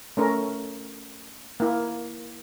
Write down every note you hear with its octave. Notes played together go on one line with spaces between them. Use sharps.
A3 C#4 A#4
A#3 E4